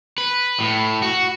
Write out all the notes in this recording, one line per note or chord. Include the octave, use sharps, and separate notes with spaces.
B4
A2
F#4